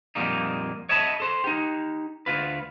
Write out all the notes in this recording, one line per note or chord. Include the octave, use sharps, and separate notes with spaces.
F2 A#2 G3 A#3 D#4
C#5 D#5 E5 A5 B5
A4 C5
D#4 G4
D2 F4 B4